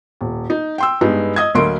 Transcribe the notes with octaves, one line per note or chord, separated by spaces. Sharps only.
D#1
D#4
G5 C6 E6
G2 G#3 B3 D#4
D#5 D#6 G#6
D2 F#3 A#3 D#5 C6 D7